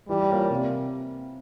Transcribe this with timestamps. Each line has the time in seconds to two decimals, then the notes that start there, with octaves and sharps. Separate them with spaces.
0.08 E3 G3
0.30 A#3 F4 A#4 C#5
0.50 C3